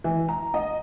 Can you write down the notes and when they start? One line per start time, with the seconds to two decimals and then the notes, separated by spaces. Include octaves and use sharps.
0.04 E3
0.29 A#5
0.54 D#5